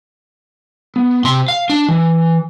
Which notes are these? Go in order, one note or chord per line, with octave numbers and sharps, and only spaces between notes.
B3
C3 C6
F5
D4
E3